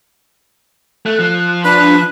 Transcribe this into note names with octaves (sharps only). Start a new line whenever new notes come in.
A3 F#6
F3
D4 B4 F#6